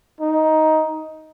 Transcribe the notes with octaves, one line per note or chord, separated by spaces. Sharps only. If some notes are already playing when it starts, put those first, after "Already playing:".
D#4